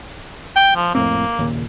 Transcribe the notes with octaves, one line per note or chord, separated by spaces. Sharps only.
G5
F3
F2 A2 A#3 C4
D#2 A#2 C#3